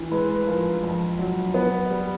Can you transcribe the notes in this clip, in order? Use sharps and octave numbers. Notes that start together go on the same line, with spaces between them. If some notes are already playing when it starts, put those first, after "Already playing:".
Already playing: E3
G#3 B4
B4
F3 A#4
F2
F#3
B3
G3